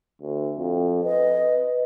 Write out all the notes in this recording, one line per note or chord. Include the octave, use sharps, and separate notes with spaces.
D2
F2
B4 D#5